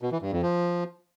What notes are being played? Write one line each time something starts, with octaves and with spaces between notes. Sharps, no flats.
B2
E3
G2
F2
F3